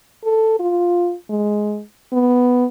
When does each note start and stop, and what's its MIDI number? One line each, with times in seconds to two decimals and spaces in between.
0.24 0.59 69
0.59 1.14 65
1.30 1.81 56
2.13 2.65 59